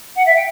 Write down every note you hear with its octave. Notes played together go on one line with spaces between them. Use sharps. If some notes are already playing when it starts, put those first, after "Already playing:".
F#5
E5
G5